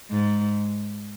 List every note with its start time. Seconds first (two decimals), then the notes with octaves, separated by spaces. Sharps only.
0.11 G#2